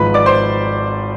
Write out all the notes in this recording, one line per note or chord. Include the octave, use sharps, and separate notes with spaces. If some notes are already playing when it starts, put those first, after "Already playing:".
Already playing: G#1 G#2 F3 B4 B5
D5 D6
C5 C6